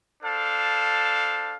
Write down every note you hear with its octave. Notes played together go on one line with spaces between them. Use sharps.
D4 A4 C5 F5